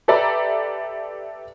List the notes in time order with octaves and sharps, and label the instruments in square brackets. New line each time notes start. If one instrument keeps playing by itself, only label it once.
[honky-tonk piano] G4 A4 B4 D5 E5 A#5